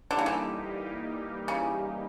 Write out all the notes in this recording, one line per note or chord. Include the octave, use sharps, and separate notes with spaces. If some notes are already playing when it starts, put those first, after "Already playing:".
D3 E3 G3 A#3 D#4 G4
C#3
D3
C#3